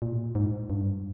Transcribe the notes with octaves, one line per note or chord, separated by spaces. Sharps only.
A#2
G#2
G2